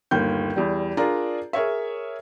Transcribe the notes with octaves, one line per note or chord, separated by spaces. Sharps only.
G1 D#2 A#4 G6
E2 G3
D4 F4 G#4 A#4 D5 A#5
G#4 A#4 C#5 E5